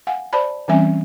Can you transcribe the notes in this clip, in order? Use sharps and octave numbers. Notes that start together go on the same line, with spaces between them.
F5 F#5 G#5
C5 D5 A5 B5
E3 G3 C4 C#4 E5 G#5